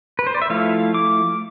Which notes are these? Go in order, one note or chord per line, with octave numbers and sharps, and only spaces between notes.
B4
C5
D5
E5
F3 A3 E4 F5
D6